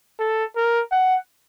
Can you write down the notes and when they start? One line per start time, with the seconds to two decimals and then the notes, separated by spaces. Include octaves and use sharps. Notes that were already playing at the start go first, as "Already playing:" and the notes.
0.19 A4
0.56 A#4
0.91 F#5